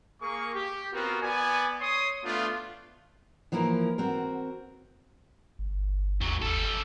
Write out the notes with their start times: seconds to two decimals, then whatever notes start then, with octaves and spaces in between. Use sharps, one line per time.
0.22 A#3 G#4 A#4 C#6
0.54 G4
0.93 B3 C4 F4 F#4 A#4
1.22 B3 D5 G#5
1.81 C#5 C6 D#6
2.24 A3 B3 D4 F4
3.52 E3 F3 A#3 E4 A#4
3.98 C4 F#4 A#4
5.59 G1
6.21 D#2 G#2 F#3
6.42 G1 G3 A4